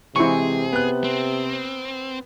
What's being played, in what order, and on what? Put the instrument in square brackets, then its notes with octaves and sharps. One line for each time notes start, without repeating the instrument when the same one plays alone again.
[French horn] C3 [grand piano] E3 G#3 C4 [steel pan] E4 C#6 [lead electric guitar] G#4
[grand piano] B3 F#6
[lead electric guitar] C4